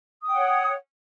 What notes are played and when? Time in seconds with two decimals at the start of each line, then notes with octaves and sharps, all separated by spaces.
0.21 D#6
0.26 G5
0.31 F#5
0.36 C#5